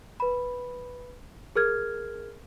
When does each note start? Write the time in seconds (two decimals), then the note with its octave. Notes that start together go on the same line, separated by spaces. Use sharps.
0.20 B4 B5
1.56 G#4 A#4 F6 G#6